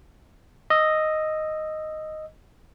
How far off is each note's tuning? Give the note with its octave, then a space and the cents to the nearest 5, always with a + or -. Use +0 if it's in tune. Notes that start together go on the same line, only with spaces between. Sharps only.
D#5 +0 E6 +0